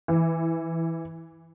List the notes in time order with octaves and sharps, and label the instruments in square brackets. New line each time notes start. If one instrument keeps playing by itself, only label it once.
[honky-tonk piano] E3